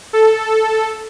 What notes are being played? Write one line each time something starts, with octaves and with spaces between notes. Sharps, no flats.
A4